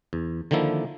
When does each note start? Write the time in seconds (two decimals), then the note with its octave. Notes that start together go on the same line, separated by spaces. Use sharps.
0.13 E2
0.51 D3 D#3 F3 A#3 E4